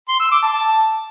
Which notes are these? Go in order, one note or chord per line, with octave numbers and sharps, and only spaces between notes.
C6
E6
D6
A5
A5